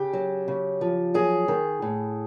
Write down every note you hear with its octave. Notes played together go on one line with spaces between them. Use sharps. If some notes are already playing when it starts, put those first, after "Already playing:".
Already playing: C#3 G4
F#3
C#3
F3
F#3 G#4
D#3
A2